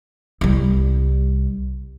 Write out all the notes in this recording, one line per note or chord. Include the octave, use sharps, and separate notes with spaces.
C2 G3